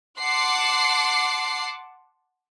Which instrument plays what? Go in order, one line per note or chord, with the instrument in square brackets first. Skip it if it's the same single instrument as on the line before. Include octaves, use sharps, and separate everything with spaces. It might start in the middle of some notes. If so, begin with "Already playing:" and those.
[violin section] F#5 A5 C6 D6 C7